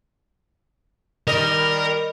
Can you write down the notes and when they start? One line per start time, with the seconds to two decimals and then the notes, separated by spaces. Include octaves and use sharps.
1.27 D#3 G3 A#4 D#5